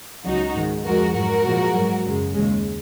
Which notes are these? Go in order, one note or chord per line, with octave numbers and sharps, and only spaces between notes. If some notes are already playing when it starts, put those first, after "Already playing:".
C#2 C#3 F#3 D#4 F#4
G#2 D#3 G#3
F2 F3 G#3 F#4 A#4
G#2 F#3 F#4 A#4
A#2 F3 G#3
G#2 F#3
F#2 C#3 G#3
D#2 C#3 G#3